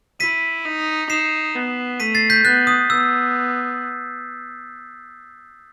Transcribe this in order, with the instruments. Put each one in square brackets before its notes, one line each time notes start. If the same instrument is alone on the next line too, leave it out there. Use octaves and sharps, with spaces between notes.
[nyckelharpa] E4 [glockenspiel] B6 D#7
[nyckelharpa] D#4
[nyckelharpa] D#4 [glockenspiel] C7 E7
[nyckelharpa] B3
[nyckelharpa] A3 [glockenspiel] B6 D#7
[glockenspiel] A6 C7
G6 B6
[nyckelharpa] B3 [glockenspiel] F#6 A6
[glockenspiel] D#6
[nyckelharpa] B3 [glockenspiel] E6